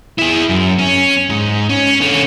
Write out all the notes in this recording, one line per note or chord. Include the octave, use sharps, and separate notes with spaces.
E4 G#4
F#2
C#4
G#2
C#4
D3 C#4